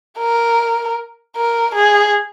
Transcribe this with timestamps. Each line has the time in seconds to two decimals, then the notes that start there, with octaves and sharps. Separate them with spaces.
0.19 A#4
1.37 A#4
1.75 G#4